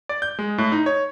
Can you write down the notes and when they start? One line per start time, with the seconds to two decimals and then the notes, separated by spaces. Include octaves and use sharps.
0.09 D5
0.22 G6
0.39 G#3
0.58 A2
0.72 D#4
0.86 C#5